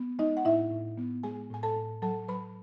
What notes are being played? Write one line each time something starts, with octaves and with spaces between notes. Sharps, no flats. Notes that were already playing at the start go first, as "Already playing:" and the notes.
Already playing: B3
G#3 D#4 D#5
F#5
A2 E4 E5
A2
B3
G#3 G#4 G#5
A2 G#5
A4 A5
A2
F#3 A4 A5
F#3 B4 B5